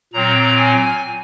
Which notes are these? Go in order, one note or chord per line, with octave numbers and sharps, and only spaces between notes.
A#2 F#3 C4 A#5
G#5